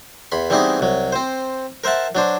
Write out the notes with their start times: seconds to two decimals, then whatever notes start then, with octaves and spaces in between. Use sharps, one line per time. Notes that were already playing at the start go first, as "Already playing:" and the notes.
0.32 E2 B5 C6
0.50 E3 G3 B3 C4 D#4 G#4
0.80 C2 F#3
1.12 C4 C5
1.84 A#4 C5 E5 F#5 A5
2.15 F#3 D4 C5